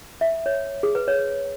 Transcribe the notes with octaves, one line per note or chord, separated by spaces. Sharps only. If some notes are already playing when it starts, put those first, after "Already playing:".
E5
C#5
G#4
B4
C#5